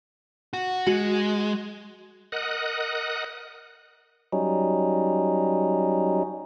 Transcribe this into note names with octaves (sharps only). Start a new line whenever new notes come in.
F#4
G#3 F#4
A#4 D#5 F#5 D#6 F#6
F#3 G3 C#4 D#4